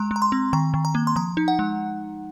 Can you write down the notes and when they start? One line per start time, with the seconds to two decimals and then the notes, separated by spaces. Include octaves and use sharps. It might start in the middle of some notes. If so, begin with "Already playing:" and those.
Already playing: G#3 A#5
0.11 G#3
0.16 A#5
0.22 C6
0.32 C4
0.53 D#3 A#5
0.74 D#3
0.85 A#5
0.95 A#3
1.07 C6
1.16 F3 A#5
1.37 D#4
1.48 F#5
1.59 G#3